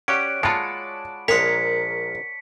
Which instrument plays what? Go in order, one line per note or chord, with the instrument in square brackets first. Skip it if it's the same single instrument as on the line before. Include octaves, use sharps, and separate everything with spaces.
[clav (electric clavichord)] C#4 G4 [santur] C#5 D5 F#5 [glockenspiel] D7
[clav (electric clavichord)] G#3 F4 [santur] A5 B5 [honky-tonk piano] C#7
[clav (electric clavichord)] A#1 G#3 C#5 [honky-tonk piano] A#4 [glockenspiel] B6 C#7